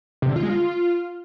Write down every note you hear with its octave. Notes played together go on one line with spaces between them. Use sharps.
C3
D3
F4
G#3
F4